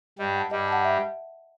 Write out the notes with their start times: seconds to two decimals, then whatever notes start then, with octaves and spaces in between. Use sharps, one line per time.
0.19 G2 G3 D#5
0.35 F#5 A5
0.51 G2 G3 D#5
0.68 F#5 A5
0.85 E5